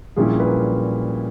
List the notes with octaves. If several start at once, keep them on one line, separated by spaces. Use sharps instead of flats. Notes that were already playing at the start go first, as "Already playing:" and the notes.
A#1 A#2 G3 C#4 E4 G#4
B4
A#4